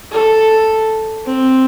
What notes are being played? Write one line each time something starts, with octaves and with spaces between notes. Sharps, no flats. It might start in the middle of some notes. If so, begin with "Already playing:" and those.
A4
C4